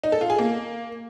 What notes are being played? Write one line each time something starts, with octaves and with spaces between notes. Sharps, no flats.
D#4
A4
F4
G#4
A#3